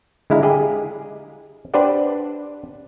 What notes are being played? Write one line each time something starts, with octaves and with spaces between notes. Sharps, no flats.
D3 G#3 E4 F5 A#5
G4 G#4 D#5
D4 G4 B4 C5 D5 F#5